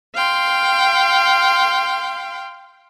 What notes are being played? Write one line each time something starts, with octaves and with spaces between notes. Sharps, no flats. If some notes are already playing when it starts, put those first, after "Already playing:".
F5 G5 C6